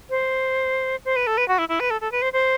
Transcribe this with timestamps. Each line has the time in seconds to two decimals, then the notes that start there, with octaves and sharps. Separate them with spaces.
0.10 C5
1.05 C5
1.16 B4
1.27 A4
1.37 B4
1.48 F#4
1.58 E4
1.69 E4
1.80 B4
1.90 A4
2.01 A4
2.12 B4
2.22 C5
2.33 C5